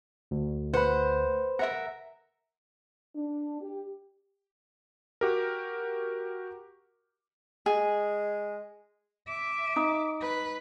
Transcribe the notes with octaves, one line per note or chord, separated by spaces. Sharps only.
D2
B4 C5 F#5 B5
A#4 E5 F#5 A#5
D4
G4
F#4 G4 A#4
G#3 G#4
E5 D6
D#4
B4